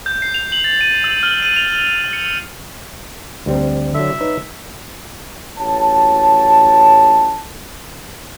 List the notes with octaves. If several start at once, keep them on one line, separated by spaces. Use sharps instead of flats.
G6
C7
F7
F#7
A6
D#7
E6
F6
D#7
F7
C#7
D2 G3 C4
D3 F#3 E5
D#4 B4 C#5
A1 F#4 C#5 A5